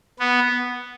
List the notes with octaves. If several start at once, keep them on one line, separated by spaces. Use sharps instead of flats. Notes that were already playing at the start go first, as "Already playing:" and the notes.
B3